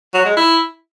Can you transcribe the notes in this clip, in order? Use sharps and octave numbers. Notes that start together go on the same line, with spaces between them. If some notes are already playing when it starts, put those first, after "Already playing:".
F#3
G#3
E4